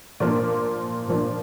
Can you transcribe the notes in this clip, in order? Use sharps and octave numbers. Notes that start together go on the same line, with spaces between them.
A#2 F3 A#3 D4 A#4 D5
A#2 F3 A#3 D4